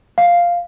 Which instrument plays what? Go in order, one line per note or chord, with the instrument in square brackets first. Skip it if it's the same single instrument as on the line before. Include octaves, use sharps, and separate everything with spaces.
[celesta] F5